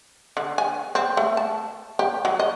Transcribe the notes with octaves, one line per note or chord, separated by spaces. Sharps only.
D3
G#5
C4
A3
A5
G4
F#3
D#5